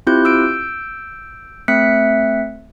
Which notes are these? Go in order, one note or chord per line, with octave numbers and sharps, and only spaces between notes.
C4 E4 F4 G4 F#6 G6
E6 G6 D7
A3 C4 E5 F#6 B6 C#7